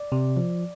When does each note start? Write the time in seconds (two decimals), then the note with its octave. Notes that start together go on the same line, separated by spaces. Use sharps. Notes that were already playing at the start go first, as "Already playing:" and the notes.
Already playing: D5
0.12 C3
0.37 F3